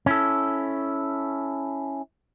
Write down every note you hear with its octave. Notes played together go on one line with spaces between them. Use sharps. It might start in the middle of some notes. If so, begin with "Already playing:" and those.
C#4 E4 A4